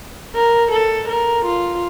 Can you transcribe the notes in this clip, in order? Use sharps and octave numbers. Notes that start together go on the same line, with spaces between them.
A#4
A4
A#4
F4